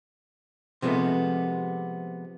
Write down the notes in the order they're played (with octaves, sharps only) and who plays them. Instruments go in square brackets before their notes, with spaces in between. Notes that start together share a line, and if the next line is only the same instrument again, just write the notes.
[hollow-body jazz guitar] C3 F3 G#3 A3 B3